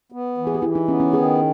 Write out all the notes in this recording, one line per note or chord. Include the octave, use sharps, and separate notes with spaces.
B3
E3
G#4
G4
E3 E4
D#4
B3 C#4
C#4
D#3 G#4